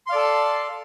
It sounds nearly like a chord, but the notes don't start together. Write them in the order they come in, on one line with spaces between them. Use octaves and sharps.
C6 F5 D5 A4 A5